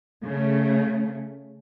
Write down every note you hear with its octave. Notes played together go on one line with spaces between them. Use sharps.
C#3 A3